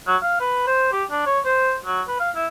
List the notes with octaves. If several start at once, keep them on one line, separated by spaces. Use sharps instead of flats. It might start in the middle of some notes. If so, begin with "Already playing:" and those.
F#3
F5
B4
C5
G4
D4
C#5
C5
F#3
B4
F5
E4